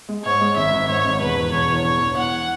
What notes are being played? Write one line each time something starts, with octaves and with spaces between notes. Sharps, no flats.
G#3
G#2 C#5
G#3
G#1 E5
G#1
G#2 C#5
G#1
E1 B4
E1
E1 C#5
E2
E1 C#5
E1
E2 F#5